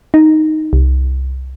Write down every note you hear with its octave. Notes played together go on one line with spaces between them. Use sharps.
D#4
C2